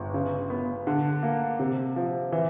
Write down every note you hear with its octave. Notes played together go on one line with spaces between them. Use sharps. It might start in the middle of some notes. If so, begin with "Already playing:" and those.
Already playing: G1
C#3
B3
D3
A#3
C3
F3
E3